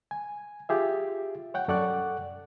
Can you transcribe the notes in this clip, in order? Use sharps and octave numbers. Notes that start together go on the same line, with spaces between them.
G#5
F4 G4 G#4 E5
C#5 F#5 G5
F#2 A4 D5 F#5 C#6 F#6